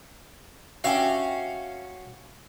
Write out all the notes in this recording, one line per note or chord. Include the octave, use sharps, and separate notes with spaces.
C#4 F#4 G4 E5 F5